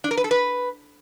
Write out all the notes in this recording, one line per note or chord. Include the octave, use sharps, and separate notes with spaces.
D4
A#4
B4
A4
B4